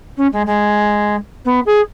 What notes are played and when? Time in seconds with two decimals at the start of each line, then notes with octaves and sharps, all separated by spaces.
0.17 C#4
0.32 G#3
0.46 G#3
1.45 B3
1.66 G#4